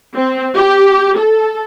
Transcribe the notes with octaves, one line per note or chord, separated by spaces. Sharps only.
C4
G4
A4